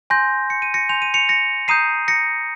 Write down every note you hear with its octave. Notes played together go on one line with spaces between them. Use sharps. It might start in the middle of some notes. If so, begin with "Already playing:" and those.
G#5 C6 G6 A#6
C#7
D#7
A#6 C#7
G#5 C6 G6 F7
D#7
C#7 F7
A#6 C#7
A#5 D#6 G6 C7 D#7
A#6 C#7